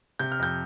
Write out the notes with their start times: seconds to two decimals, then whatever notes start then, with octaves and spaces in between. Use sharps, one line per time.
0.19 C3 G6
0.32 F6
0.39 F2 G6